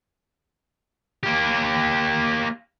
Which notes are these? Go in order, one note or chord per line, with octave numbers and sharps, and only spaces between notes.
A#3 G4